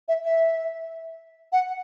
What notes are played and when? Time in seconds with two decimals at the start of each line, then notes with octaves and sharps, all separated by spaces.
0.08 E5
0.24 E5
1.52 F#5